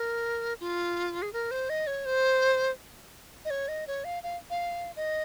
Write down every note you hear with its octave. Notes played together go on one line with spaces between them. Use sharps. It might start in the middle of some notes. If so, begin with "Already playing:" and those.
Already playing: A#4
F4
G#4
A#4
C5
D#5
C#5
C5
D#5
C#5
D#5
C#5
F5
F5
F5
D#5